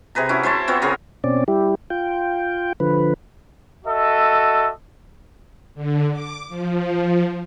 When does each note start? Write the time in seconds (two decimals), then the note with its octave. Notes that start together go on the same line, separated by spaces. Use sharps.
0.15 C3 G#4 B4 A#5
0.29 C#4 E4 F#4
0.43 E4 C5 C#5 A5
0.68 B3 C4 F4 C#5
0.82 C#3 B3 G#4 A#4
1.24 B2 C4 C#4 D5
1.48 G3 E4 G4
1.90 F4 G5
2.80 D3 F3 B4
3.85 F#4 A4 D#5 E5
5.75 D3
6.11 D6
6.49 F3